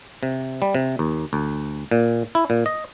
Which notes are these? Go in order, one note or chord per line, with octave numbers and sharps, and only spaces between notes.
C3
G3
C3
D#2
D2
A#2
E4
A#2
D#5